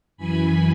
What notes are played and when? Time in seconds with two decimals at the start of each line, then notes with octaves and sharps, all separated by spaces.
0.17 F#2 E3 G#5 B5